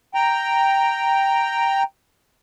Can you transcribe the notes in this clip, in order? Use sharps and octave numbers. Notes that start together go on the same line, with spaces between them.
G5 A#5